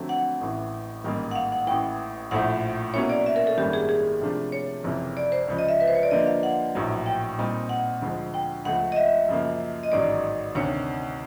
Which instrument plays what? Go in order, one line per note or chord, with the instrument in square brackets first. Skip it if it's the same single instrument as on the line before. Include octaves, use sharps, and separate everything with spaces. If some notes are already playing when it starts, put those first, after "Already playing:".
Already playing: [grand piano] F2 D3 F#3 A3 C4
[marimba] F#5
[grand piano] A1 A2 E3
A1 G#2 D#3 G3 A#3
[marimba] F#5
F5
F#5
[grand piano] A1 A2 E3 [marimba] G5
[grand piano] A#1 A2 F3 A3 [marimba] F#5
[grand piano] B2 F#3 A#3 C#4 E4 [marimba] C#5
[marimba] D5
E5
A#4
A4
[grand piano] G#1 F#2 D#3 G3 A#3 [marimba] G4
[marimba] G#4
G#4
[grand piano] C3 F3 A3 D4 F4
[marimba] C#5
[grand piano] F#1 F2 C3 E3
[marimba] D5
C5
[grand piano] C#2 C#3 F3
[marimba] D#5
E5
B4
C5
C#5
D5
[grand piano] D3 F3 A#3 [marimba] D#5
[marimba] F5
F#5
[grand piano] A#1 A2 F#3
[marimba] G5
[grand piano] A#2 G3 C4 D#4
[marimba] F#5
[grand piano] D2 D3 F3 G#3
[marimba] G5
[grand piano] C#2 C#3 F3 A3 [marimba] F#5
[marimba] D#5
E5
[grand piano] F#2 C#3 F3 A#3
[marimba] D#5
[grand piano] A1 G#2 D#3 F#3 [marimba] D5
[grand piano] D2 C3 D#3 [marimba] C#5